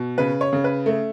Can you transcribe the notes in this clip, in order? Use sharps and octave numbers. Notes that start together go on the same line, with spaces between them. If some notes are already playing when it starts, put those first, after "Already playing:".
Already playing: B2
C#3 B4
C#5
C#3
B4
A3